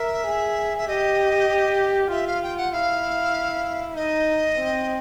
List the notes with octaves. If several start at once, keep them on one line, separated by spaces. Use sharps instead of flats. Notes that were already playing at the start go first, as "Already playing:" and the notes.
Already playing: A#4 E5
G#4
E5
G4 D#5
F4 E5
F5
G5
F#5
E4 F5
D#4 D#5
C4